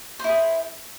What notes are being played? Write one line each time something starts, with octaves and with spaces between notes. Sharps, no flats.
E4 G#4 C5